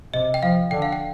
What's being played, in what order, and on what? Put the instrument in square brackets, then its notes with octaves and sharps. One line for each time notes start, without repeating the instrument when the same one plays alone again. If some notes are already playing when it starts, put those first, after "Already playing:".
[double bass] C3 [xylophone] D#5
[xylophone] G5
[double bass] F3 [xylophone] F5
[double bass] D3 [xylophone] G5
[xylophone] F5
G5